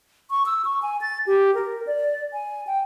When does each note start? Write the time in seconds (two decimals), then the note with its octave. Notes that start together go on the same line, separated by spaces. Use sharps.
0.31 C#6
0.46 E6
0.65 C#6
0.82 G#5
1.02 A6
1.27 G4
1.55 A#4
1.87 D5
2.33 G#5
2.67 G5